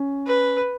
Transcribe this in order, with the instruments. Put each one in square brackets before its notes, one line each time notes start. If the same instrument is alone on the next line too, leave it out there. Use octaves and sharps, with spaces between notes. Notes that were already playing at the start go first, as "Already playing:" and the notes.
Already playing: [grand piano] C#4
[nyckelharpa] B4